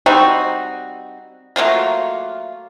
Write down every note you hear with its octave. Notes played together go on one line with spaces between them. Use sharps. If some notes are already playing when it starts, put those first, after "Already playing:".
G3 C4 D#4 F#4
F#3 A3 A#3 F4